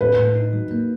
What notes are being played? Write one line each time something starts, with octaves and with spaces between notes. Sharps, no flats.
A2 B4
A2
D#4
F#3
A#3